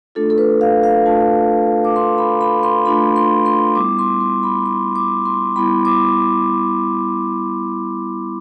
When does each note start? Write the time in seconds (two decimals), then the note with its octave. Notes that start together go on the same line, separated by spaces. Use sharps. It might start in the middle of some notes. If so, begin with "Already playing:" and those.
0.15 A3 D4 F4 A4
0.30 A4
0.38 B4
0.61 F5
0.83 F5
1.06 A3 D4 F4 A5
1.84 D6
1.95 A3 D4 F4 C6
2.18 B5
2.41 B5
2.63 C6
2.86 A3 D4 F4 B5
3.16 C6
3.46 C6
3.75 G3 B3 E4 D6
3.99 C6
4.20 C6
4.43 B5
4.65 G3 B3 E4 C6
4.96 D6
5.26 C6
5.56 G3 B3 E4 B5
5.85 D6